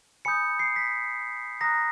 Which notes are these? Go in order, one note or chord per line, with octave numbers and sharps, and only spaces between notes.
G#5 B5 D#6 G6 C#7
C7
B6
A#5 D#6 F#6 A#6